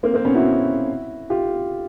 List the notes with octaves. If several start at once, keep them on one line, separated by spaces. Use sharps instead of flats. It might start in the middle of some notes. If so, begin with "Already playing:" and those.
A#3 C4
A#3 C4
B3 C#4
E4 F#4
F4 G4